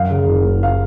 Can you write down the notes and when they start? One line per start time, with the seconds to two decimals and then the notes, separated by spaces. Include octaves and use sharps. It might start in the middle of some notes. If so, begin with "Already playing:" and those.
Already playing: F#2 F5
0.10 C#3
0.27 F#1
0.45 F#1
0.63 F5